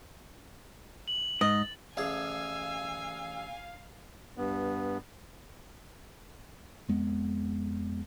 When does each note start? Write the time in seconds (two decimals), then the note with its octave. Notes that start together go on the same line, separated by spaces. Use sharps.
1.08 F#7
1.41 G#2 D#5 A6
1.97 A1 G#4 F5 G#5 E6
4.37 G2 B3
6.89 F2 G#3 B3